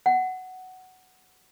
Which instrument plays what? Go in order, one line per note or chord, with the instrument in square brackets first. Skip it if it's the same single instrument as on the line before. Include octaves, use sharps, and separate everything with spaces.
[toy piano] F#5